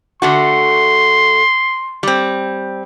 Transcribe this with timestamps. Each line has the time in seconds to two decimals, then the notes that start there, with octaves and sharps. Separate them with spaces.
0.22 D3 A3 F#4 C6
2.03 G3 C4